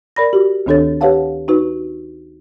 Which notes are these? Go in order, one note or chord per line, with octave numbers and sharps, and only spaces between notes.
A#4 D5 B5 A#6
F#4 G4
D2 D#3 D4 A4 C#5 A6
G4 B4 C#5 F5 F#5 A5
D#4 F#4 B4